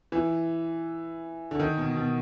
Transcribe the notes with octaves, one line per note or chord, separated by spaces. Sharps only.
E3
D3
D#3
B2
B2